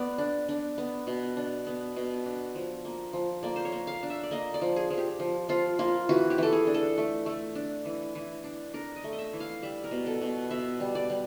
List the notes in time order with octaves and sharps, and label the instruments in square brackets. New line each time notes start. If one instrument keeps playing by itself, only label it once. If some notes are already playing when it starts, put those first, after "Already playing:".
Already playing: [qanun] B3 D5
D4
D4
B3
B2
D4
B3
B2
D4
F3
A#3
F3
A#3 D5
C5
C#5
A#3
F5
D4
E5
D5
A#3 D#5
D5
F3
G#4
F3
G4
F3
F3 F4
A#3 F4
E3 F#4
G4
E3 A4
G#4
D4
A4
A3
A3
D4
E3
E3
D4
D4 A#4
D#5
A3
D#5
E5
E3
F5
G3 E5
A#4
B2
A4
B2
B2 E5
G3
D5
G3